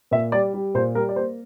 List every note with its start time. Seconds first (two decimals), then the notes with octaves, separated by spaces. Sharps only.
0.11 A#2 E5
0.32 G3 D5
0.54 G3
0.75 A#2 C5
0.95 G3 A#4
1.09 D5
1.16 A#3 C5